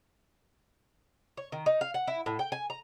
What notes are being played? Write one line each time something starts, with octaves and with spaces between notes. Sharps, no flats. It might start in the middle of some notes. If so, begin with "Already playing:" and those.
C#5
D#3
D#4
F5
F#5
E4
A2
G5
G#5
A#5